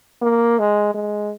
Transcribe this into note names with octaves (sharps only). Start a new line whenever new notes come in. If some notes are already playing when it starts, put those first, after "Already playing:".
A#3
G#3
G#3